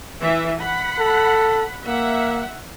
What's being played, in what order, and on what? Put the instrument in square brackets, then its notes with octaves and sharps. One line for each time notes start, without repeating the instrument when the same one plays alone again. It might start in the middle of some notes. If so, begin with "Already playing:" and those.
[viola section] E3 E5
F#5 B5
[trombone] A4
[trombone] A#3 [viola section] E5 F#5